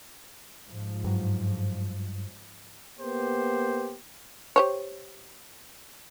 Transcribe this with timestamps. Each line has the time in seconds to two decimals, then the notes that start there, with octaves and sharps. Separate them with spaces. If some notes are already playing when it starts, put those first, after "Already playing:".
0.67 G#2 F3
1.04 G2 F#3
3.00 A#3 B3 G4 C5
4.56 G4 C5 C#5